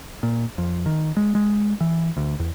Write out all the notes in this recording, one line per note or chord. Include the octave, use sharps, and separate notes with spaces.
A#2
F2
D#3
G#3
G#3
E3
D2
E2